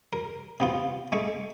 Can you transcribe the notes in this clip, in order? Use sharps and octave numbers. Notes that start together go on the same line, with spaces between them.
A#4
C3 B3 F4
G#3 A3 C#6